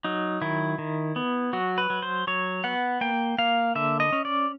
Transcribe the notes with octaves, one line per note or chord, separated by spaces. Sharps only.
F#3 D#4
D#3 E4
D#3
B3
F#3 F#4
B4
F#3
C5
F#3 C#5
B3 F#5
A#3 G5
A#3 F5
D3 E5
D#5
C#4
D5